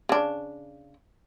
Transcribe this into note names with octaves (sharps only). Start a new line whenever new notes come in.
C#3 D4